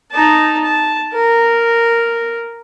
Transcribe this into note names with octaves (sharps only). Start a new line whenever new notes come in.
D#4 A5
A5
A#4